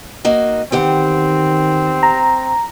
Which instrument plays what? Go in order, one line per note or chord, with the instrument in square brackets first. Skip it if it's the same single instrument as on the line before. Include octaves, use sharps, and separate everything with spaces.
[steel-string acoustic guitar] A#3 D#4 F#4
[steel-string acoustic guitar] E2 G4 F#5 [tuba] D#3 [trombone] C4
[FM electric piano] A#5